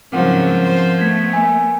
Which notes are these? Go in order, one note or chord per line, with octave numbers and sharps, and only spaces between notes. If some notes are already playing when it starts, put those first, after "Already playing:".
G#2 C#3 F3 F#3 C4 A#4 F#5
C5
A3 B3 G#6 B6
A#3 G#5